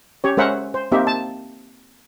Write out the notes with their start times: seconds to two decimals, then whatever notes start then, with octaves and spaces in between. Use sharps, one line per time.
0.24 C#4 G4 C#5
0.37 G#3 C#4 A#4 C5 E5 F#5
0.74 C5
0.92 A#3 C4 D#4 G4 E5
1.07 A5